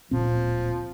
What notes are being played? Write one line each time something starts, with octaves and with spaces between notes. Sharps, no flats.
D1 A#2 F3 C4